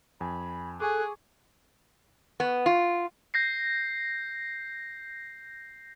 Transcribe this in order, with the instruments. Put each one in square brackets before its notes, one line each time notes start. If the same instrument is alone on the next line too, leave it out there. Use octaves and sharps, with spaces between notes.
[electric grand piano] F2 G#5 [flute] B5
[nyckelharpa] G#4 [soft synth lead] A4 [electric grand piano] G#5 C#6 D6 [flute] F#6
[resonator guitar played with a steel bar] B3
F4
[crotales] G6 A#6 C7